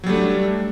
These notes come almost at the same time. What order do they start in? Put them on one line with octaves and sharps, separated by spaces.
F#3 G3 A3 D4